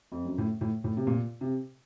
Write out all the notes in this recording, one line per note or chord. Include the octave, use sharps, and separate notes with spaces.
F2
F#2
A2
A2
A2
C3
A#2
C3